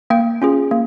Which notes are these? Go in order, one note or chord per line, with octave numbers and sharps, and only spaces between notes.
A#3 G5
C#4 F4 G#4
A#3